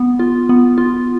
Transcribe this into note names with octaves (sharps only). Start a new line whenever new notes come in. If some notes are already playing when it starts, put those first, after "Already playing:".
Already playing: B3
F4
B3
F4